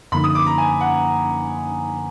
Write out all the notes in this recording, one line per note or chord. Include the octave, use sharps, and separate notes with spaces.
F#2 D3 F3 A#3 D#4 B5
D#6
D6
A#5
G#5
F#5